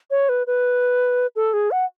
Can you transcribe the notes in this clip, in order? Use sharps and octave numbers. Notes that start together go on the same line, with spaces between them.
C#5
B4
B4
A4
G#4
F#5